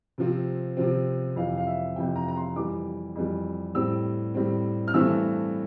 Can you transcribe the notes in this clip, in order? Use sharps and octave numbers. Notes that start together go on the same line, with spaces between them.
C3 F3 C4
C3 F3 C4
F2 C3 E3 F5
F5
E5
F2 C3 E3 G5
A#5
A#5
C6
F2 E3 G3 D6
F2 E3 G3
A2 G3 C4 E6
A2 G3 C4
F6
G2 E3 A3 C4 E6